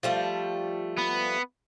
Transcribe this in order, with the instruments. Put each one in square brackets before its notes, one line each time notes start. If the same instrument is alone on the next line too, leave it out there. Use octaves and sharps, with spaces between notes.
[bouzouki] F3 G3 A3
[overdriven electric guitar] B3